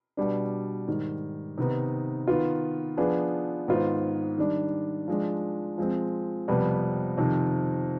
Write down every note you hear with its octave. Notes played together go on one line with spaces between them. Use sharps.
B2 G3 D4
G#2 D#3 G3
C3 D#3 B3 D#4
D#3 B3 F4
F3 B3 D4 G#4
G#2 D#3 B3 F4 C5
D#3 G3 D4
F3 G#3 D4
F3 G#3 C4
F2 C3 G3 B3
F2 C3 D#3